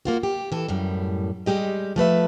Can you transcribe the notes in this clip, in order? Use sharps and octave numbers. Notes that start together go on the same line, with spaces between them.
A#3 F4 F#4
G4
E3 A4
F#2 A2 G3
G3 G#3 G4 D#5
F3 A3 B4 E5